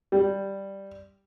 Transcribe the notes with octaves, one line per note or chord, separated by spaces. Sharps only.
G3